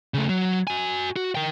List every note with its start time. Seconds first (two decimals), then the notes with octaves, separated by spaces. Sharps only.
0.14 C#3 A3
0.29 F#3
0.67 F#4 G#5
1.16 F#4
1.35 A#4 G5